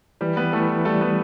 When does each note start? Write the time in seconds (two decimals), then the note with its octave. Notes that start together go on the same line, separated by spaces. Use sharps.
0.21 E3 G3 G4
0.37 B3 B4
0.53 E3 A3 A4
0.85 G3 A3 A4
1.01 B3 B4